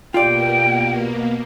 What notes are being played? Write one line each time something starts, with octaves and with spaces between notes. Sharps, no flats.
B2 A#3 F4 G4 D5 G5